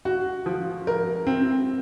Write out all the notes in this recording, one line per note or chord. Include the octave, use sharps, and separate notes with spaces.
F#4
F3
A#4
C4